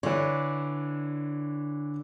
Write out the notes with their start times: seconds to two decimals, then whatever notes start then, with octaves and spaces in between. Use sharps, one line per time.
0.03 D3 E3 D4 C#5